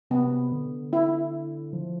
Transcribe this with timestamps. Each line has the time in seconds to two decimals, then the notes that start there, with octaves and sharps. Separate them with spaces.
0.10 C3 B3
0.52 D3
0.93 E4
1.73 F3